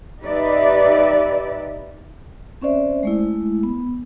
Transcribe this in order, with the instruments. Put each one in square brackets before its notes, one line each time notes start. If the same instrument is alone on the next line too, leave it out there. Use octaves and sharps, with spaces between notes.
[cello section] D#4 G4 B4 D5 E5
[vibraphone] C4 C#4 C5 D5 E5
G#3 A3 E4
B3